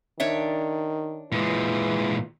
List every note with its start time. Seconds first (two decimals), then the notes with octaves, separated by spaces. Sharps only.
0.20 D#3 D4 C#5 E5
1.32 A#2 E3 G#3